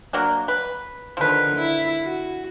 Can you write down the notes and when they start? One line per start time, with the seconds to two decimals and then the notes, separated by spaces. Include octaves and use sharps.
0.13 F#3 A#3 D4
0.48 B4
1.17 D3 D#3 F3 B4
1.56 E4
2.03 F#4